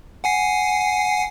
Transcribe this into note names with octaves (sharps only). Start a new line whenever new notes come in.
F#5 G#5 C7